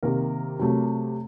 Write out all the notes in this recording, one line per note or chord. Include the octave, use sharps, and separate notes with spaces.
C3 D#3 A#3 A#4
C3 F#3 A3